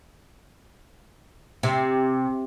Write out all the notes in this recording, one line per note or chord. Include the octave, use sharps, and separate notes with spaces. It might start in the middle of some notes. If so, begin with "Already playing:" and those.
C3